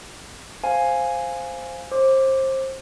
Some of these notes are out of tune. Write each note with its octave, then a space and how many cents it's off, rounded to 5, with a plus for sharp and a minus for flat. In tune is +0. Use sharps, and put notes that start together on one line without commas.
C5 +0 F5 +0 G#5 +0
C5 +25 D6 +0